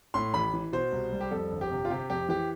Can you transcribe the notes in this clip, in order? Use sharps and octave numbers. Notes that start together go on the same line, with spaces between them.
A2 C6
A1 B5
E3
B2 C5
C2
G3
G4
F2 A4
G1
G4
C3
F4
C3 G4
F2 G4
E3 G4